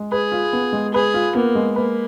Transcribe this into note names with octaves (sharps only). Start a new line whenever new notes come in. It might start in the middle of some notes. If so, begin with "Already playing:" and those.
Already playing: G#3
G#4 B4
F4
B3
G#3
G#4 B4
F4
A#3 B3
G#3
A#3 B4